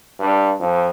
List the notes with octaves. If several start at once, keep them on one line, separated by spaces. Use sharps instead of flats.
G2
F2